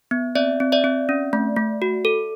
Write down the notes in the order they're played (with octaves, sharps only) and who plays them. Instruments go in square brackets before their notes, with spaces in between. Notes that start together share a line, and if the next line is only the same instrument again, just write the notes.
[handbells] B3
C4 D5 E5
C4
D5 E5
C4
C#4
A3
A3
F#4
A4